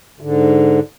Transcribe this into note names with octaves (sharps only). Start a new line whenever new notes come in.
G#2 D3